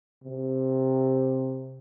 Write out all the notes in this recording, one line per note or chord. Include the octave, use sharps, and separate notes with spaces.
C3